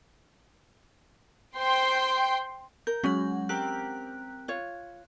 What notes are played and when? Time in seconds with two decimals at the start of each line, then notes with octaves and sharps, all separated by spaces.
1.58 C5 G5 C6
2.87 A#4 G6
3.04 F#3 G#3 C#4 F#5
3.49 C4 G4 A#4 F#6
4.48 F4 C#5